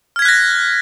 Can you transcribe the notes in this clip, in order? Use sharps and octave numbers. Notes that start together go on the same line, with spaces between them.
F6 F#6 G#6 A#6 B6